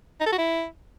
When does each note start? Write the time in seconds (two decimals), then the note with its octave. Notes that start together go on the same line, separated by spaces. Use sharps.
0.20 D#4
0.26 A4
0.32 F#4
0.38 E4